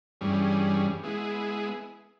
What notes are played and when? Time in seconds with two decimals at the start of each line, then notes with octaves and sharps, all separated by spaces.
0.21 G2 E3 G3 C#4 G#4
1.03 G#3 B3 E4 G#4